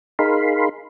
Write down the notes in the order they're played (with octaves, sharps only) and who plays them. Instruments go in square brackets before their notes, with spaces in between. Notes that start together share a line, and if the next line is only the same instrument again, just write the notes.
[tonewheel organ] D#4 G#4 A#4 F5 B5 C6